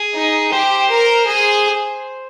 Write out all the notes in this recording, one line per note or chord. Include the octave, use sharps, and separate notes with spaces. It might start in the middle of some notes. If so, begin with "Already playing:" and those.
Already playing: G#4
D#4
G4 C5
A#4
G#4